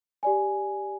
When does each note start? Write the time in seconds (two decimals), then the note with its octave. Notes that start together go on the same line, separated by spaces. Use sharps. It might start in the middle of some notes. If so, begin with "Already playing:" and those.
0.23 G4 D5 G#5